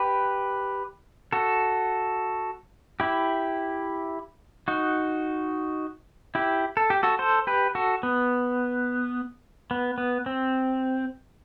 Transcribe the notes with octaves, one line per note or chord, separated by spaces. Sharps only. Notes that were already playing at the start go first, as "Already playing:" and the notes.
Already playing: G4 B4
F#4 A4
E4 G4
D#4 F#4
E4 G4
A4
G4
F#4 A4
A4 C5
G4 B4
F#4 A4
B3
B3
B3
C4